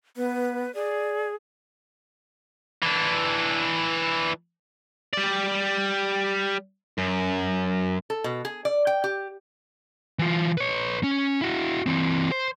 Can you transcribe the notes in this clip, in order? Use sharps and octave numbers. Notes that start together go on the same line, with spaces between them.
B3 B4
G#4 D5
E3 D4
G3 D5
F#2
A4
B2
G#4
D5
G5
G4
E3 F4
B4 C#5
C#4
E4 F#4
E3 C4
C5